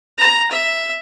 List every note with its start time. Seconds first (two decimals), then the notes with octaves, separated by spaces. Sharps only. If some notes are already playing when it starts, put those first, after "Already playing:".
0.18 A#5
0.51 E5